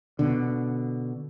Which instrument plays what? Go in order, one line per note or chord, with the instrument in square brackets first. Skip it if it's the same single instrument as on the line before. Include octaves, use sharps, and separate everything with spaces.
[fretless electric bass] B2 D3